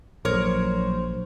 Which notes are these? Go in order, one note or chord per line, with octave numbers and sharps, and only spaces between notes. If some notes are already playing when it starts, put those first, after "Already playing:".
A#1 F#3 A#4 C5 C#5